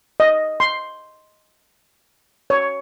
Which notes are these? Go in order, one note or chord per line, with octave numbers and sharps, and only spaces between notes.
D#5
C6
C#5